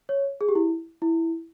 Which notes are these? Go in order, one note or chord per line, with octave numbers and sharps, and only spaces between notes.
C#5
G#4
G4
E4
E4